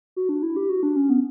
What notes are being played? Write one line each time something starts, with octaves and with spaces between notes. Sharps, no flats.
F#4
D4
E4
G4
F#4
D4
C#4
B3